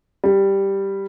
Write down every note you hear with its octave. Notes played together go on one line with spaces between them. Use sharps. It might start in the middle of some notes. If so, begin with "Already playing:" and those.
G3